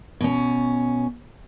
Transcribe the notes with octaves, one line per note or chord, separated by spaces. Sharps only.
B2 C#4